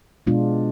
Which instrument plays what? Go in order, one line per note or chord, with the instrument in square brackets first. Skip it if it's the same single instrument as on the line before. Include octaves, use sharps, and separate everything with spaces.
[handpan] B2 G#3 B3 D4 F4